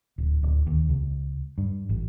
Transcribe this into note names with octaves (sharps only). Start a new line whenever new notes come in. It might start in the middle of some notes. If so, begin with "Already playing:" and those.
D1
D1
D#2
C#2
G2
A1